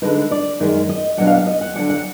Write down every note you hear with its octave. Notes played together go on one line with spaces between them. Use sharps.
D3 G#3 D#4 B4
D5
F#2 D#3 G#3 D#4
D#5
B2 F#3 D4 F#5
F5
F5
D#5
F#5
D3 F#3 D4 F#5
F#5